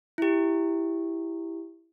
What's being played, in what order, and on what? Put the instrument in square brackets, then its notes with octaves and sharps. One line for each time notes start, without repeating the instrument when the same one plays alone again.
[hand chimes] E4 G4